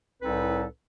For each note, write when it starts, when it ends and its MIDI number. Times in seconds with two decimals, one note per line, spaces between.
0.22 0.65 36
0.22 0.65 45
0.22 0.65 60
0.22 0.65 63
0.22 0.65 69
0.22 0.65 71